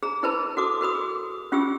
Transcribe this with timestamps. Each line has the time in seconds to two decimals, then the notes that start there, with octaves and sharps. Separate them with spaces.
0.03 G#4 A#5
0.23 E4 G#4 A#4 B4 A5 B5
0.57 F#4 A4 D6 D#6
0.81 F#4 A#4 B5 D#6
0.95 G#4
1.52 C#4 F4 G4 G#4 E6